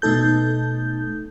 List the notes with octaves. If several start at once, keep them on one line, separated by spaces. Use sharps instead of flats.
B2 A3 D#4 A4 G6